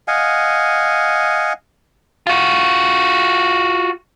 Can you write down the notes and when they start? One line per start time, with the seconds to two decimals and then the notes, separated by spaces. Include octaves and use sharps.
0.08 D#5 F5 F#5 G#5
2.27 F4 F#4